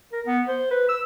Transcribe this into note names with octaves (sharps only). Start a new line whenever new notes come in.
A#4
B3
C5
B4
E6